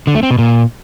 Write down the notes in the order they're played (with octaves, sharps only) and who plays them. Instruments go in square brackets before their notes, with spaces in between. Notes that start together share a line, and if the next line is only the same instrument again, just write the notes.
[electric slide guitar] D3
A3
C4
B2
A#2